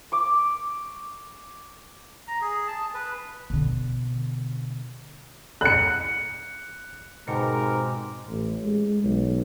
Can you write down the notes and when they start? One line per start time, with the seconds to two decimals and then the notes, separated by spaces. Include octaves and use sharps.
0.12 C#6 D6
2.28 A#5
2.41 G#4
2.67 A5
2.94 B4
3.50 B2 D3
5.61 F#6 C#7
7.27 G#2 B2 G#3 C4 G4 A#4 C#7
8.28 A1
8.63 G#3
9.04 B1